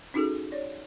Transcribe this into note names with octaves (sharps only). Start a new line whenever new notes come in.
C#4 D#4 F#4 G#4 A4
C#5 D5